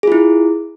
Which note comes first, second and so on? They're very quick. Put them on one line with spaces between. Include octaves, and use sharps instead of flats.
G#4 F4 E4